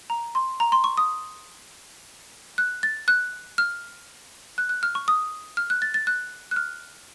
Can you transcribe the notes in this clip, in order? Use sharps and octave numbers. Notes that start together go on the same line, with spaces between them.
A#5
C6
A#5
C6
C#6
D#6
F#6
A6
F#6
F6
F#6
F#6
F6
C#6
D#6
F6
F#6
A6
A6
F#6
F#6
F6